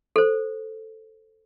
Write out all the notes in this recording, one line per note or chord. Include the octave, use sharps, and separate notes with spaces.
A4 C5